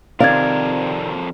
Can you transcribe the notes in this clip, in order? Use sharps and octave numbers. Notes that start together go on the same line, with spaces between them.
F2 C3 D#3 C4 A#4 D5 F5 G#6